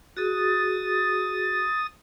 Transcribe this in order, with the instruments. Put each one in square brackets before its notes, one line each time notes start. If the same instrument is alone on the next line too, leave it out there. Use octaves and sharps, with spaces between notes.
[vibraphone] F#4 G#4 [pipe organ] D#6 A6